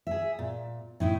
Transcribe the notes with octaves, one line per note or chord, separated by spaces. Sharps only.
G#4 E5
A#2
A2 D#4 E4